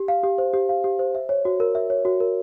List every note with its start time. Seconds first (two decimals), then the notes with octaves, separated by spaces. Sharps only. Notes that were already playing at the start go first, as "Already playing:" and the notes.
Already playing: G4
0.08 F5
0.24 G4
0.38 C5
0.54 G4
0.69 F5
0.84 G4
0.99 C5
1.15 E5
1.29 C#5
1.45 F#4
1.60 A#4
1.75 E5
1.90 C#5
2.05 F#4
2.20 A#4